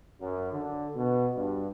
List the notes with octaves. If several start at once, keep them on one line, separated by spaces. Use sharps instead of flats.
F#2
D3
B2
G2